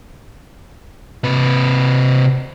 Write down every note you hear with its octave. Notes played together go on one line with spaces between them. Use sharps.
C3 B4